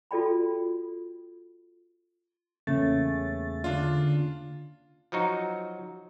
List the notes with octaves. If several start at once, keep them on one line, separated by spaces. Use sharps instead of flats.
F4 F#4 A4 D5 G5 B5
E2 C#3 A3 A#3 C#4 A6
D3 D4 F4
F3 F#3 D#4 F#4